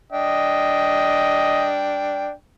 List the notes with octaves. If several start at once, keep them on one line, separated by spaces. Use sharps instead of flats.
D4 D#5 G5